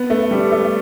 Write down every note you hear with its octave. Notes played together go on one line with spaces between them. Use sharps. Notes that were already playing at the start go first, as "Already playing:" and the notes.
Already playing: B3
A3
G3
A3